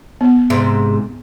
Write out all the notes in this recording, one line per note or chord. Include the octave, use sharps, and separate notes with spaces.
B3
G#2 C3